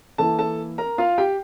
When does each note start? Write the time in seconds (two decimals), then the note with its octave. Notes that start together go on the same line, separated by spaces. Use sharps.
0.18 E3 A#3 E4 A4 A5
0.39 A4 A5
0.78 A#4 A#5
0.98 F4 F5
1.18 G4 G5